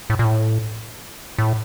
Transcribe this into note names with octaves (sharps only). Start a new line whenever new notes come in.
A2
A#2
A2
A2